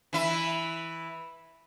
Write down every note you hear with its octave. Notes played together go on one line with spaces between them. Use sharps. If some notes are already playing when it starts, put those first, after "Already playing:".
E3 E4